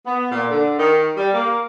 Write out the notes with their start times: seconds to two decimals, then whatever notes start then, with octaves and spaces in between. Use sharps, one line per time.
0.05 B3
0.31 A#2
0.49 D3
0.78 D#3
1.17 G3
1.33 A#3